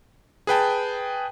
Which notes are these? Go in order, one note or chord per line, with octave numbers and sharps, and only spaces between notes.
G#4 B4 G5 A5